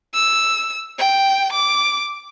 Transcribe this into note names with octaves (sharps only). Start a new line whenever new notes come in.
E6
G5
D6